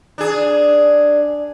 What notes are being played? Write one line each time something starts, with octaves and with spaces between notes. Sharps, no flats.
D4 G#4